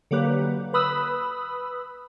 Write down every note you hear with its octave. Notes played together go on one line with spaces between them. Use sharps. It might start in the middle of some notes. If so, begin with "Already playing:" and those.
D3 F#3 A#3 G4 B4
B4 B5 D#6 E6